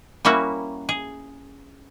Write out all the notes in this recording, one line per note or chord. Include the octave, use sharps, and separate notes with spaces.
G3 A#3 C#4 E4 F#4
G#4